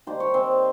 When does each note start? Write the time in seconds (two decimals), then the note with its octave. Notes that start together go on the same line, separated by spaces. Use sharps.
0.07 D#3 G3 A#3 C5
0.20 C#5
0.34 C4 C5